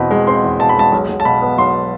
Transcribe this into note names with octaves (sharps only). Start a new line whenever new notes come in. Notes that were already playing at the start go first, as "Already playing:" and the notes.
Already playing: E2 B2 C4 B5
G#3
C4 C6
E2
B2 A5
B5
G#3 A5
B1
B1
A5
B2 B5
B3
B1 C6